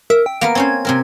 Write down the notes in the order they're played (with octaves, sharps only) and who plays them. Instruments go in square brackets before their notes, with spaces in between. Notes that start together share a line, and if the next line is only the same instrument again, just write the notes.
[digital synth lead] A#4 [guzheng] E5
[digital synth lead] G5
[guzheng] A#3 B3 A#4 [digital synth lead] D7
[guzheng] C4 C#4 C5 [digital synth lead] G#6
[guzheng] C3 C4 A#4